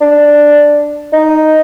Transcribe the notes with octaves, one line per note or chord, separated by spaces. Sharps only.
D4
D#4